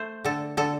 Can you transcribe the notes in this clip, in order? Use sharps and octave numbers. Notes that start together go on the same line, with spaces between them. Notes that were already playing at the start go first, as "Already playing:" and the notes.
Already playing: A3 C5
D3 A4
D3 A4